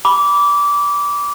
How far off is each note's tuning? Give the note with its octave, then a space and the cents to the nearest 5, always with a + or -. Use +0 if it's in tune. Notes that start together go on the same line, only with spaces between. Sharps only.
B5 -10 D6 -20